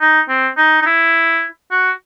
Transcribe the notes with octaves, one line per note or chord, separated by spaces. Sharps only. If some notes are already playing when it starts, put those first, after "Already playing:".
D#4
C4
D#4
D#4
E4
F#4